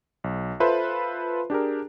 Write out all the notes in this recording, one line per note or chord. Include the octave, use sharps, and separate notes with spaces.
B1
F4 A4 B4 C5 E5
D4 G4 G#4 A#4